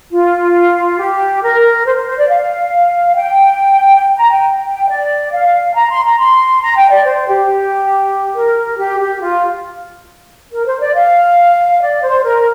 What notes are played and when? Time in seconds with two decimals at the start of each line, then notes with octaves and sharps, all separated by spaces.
0.12 F4
0.99 G4
1.42 A#4
1.85 C5
1.96 C5
2.07 C5
2.18 D5
2.29 F5
3.15 G5
4.16 A#5
4.31 G5
4.67 G5
4.88 D5
5.32 F5
5.75 A#5
5.90 C6
6.04 A#5
6.18 C6
6.61 A#5
6.76 G5
6.91 D5
7.05 C5
7.27 G4
8.35 A#4
8.78 G4
9.00 G4
9.21 F4
10.51 A#4
10.65 C5
10.80 D5
10.94 F5
11.81 D5
12.02 C5
12.24 A#4